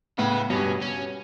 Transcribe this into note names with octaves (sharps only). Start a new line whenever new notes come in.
A2 C#3 B3
G2 B2 C#4
C#4